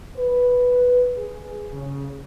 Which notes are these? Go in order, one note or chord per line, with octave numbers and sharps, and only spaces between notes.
B4
G#4
C#3